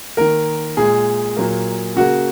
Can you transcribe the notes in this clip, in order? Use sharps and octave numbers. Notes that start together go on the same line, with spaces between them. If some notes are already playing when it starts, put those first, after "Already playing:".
D#3 A#3 A#4
A#2 G#3 G#4
A#2 F#3 A#3
C#3 A#3 F#4